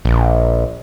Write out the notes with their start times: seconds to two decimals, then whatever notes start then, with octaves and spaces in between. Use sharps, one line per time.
0.05 A#1